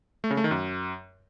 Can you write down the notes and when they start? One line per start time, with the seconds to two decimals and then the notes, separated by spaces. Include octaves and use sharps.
0.24 A3
0.31 C#3
0.37 A3
0.44 D#3
0.51 F#2